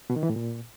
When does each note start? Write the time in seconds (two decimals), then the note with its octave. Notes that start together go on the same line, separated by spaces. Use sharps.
0.10 B2
0.16 D#3
0.23 E3
0.29 A2
0.36 A#2